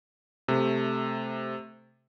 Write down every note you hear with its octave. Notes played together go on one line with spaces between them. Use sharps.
C3 A3